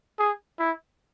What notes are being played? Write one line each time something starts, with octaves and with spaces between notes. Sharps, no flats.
G#4
E4